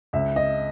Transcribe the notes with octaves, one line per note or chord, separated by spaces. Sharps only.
C#2 E5
D#5